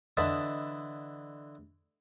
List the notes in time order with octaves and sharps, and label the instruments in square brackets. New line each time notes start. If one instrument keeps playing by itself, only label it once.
[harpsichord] D3 E3 D#5 A5 B5